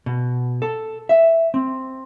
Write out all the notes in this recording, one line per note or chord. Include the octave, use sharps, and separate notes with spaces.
B2
A4
E5
C4